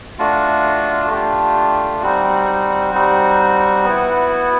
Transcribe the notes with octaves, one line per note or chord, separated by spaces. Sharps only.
A3 D4 F4 F#4
A3 D4 F4 G4
G3 C4 D#4 F#4
G3 C4 D#4
B3 E4